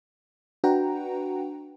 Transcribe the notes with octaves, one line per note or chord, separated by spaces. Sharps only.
D4 F#4 B4 F#5 G5 A#5